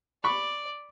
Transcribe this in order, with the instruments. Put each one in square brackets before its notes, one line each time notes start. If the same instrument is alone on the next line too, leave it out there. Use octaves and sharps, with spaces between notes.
[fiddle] D5 [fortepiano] B5 C#6